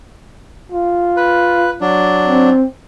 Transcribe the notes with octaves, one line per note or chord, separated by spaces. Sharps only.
F4
B4
F#3 D4
C4